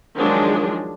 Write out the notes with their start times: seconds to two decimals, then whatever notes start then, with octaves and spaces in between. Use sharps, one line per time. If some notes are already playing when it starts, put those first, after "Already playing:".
0.15 D#3 F3 F#3 G#3 D4